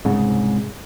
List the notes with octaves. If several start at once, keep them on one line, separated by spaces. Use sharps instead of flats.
C2 G#2 C#3